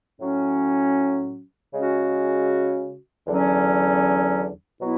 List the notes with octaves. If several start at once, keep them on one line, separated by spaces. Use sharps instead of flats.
A2 F#3 C#4
C#3 G#3 C#4 F#4
E2 D3 F#3 C#4
B2 F#3 B3 E4